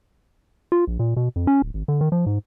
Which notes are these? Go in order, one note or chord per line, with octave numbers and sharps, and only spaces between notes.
F4
A#1
A#2
B2
F2
C#4
D1
G#1
D3
D#3
F3
G#2